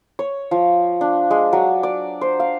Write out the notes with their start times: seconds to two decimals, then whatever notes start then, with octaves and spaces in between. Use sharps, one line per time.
0.19 C#5
0.51 F3
1.01 D4
1.31 G#3
1.53 F#3
1.83 D5
2.21 C5
2.40 F5